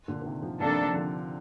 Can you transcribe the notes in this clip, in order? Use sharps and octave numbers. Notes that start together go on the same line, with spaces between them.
A#2 D3
D3
C3 D#3
D3 F3
C3 D#3 F3 A#3 D4 A4
D3 F3